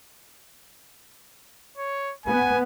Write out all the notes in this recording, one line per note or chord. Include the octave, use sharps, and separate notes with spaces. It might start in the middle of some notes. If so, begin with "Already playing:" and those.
C#5
B3 G#5